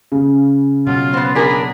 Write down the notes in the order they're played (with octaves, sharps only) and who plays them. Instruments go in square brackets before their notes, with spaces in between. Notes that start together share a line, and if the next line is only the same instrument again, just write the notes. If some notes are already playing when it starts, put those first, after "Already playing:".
[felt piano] C#3
[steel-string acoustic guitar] B2 F#3 [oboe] F4
[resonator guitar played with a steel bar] B3 C4
[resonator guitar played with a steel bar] D4 G#4 A#4 [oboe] B5